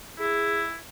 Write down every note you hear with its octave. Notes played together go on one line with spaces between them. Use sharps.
E4 G#4